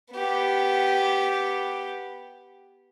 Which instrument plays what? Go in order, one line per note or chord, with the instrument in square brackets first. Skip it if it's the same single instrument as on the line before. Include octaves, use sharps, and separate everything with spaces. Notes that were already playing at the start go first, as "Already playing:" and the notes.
[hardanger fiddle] B3 G4